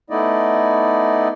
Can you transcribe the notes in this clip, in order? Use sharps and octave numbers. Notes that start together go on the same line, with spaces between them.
A3 B3 D#4 E4 D5 D#5